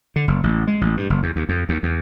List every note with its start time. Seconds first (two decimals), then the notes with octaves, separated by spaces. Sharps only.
0.16 D3
0.28 F#1
0.43 A1
0.67 G#3
0.81 A1
0.97 G2
1.10 F#1
1.23 E2
1.36 D#2
1.49 F2
1.69 D#2
1.83 E2